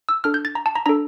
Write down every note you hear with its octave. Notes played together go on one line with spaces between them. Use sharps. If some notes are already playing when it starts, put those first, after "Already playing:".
E6
D4 A4 F6
G6
A6
A#5
A5
A#5
D4 A4 A#5